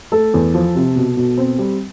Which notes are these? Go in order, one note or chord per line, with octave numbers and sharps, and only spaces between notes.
A3 A4
E2
F3
C3
B2
B2
C4
G3